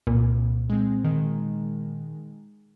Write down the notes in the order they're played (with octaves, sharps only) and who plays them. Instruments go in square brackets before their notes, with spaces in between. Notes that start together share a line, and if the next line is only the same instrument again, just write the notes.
[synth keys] C2 [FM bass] A#2
[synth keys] G#3 C4
D#3 G#3